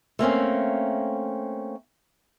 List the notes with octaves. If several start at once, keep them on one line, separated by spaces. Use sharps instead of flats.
A3 A#3 C4 C#4